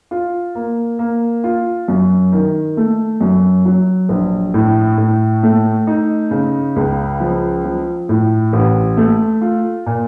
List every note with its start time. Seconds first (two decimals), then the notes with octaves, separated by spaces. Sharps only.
0.11 F4
0.55 A#3
0.99 A#3
1.44 F4
1.88 F#2
2.32 D#3
2.77 A3
3.21 F#2
3.65 F#3
4.09 A#1
4.54 A2
4.98 A2
5.43 A3
5.87 D#4
6.31 C#3
6.76 C#2
7.20 F3
7.64 F3
8.09 A2
8.53 A1
8.97 A3
9.41 F4
9.86 A#2